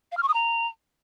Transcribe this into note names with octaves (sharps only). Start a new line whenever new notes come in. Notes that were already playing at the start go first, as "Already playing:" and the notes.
F5
F6
C#6
D#6
A#5